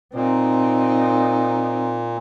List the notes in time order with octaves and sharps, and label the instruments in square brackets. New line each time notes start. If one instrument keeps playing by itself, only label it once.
[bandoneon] A#2 [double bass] C4 D#4